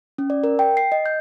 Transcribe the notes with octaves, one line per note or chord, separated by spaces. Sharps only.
C#4
D5
A#4
G5
C7
D#5
G6